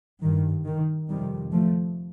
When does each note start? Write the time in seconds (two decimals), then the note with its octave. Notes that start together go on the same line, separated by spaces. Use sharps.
0.22 G2 D#3
0.66 D#3
1.09 F2 C3 D#3 G3
1.52 F3 A3